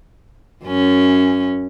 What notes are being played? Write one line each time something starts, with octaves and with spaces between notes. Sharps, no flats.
F#2 C#4